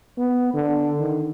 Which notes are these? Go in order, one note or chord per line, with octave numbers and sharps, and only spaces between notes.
B3
D3
D#3